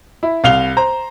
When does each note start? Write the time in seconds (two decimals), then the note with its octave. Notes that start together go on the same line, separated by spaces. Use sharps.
0.23 E4
0.44 C2 F5 F7 G7
0.77 C5 A#5